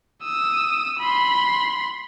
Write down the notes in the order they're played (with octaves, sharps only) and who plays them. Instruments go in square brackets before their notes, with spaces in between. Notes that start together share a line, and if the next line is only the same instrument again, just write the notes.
[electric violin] D#6 E6
B5 C6